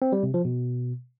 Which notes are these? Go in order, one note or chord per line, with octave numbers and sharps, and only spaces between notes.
C4
G3
C3
F3
B2